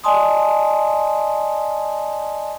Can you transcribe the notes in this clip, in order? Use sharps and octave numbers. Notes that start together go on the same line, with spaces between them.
D5 D#5 G#5 A5 C6 D#6